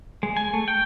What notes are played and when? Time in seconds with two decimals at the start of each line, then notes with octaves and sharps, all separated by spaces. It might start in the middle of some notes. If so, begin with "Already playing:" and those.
0.23 G#3
0.37 G#5
0.53 A3
0.68 G5